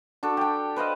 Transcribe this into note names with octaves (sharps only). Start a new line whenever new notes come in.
D4 F#4 A4
G4 G5
B4 C5 D#5 F5